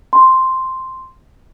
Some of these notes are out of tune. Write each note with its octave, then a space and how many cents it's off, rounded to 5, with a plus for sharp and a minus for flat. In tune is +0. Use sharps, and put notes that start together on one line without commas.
C6 +0